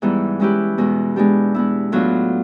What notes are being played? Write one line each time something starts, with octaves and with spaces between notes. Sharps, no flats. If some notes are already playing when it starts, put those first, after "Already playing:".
G#2 E3 G3 B3 E4
G#3 C#4 E4 G4 B4
E2 B2 G#3
G#3 B3 D4 G4
G#3 B3 E4
A2 F#3 B3 D4 F4